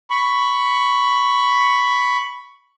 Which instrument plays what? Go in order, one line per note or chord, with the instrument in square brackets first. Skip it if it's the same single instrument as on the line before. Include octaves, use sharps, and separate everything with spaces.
[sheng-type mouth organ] B5 C#6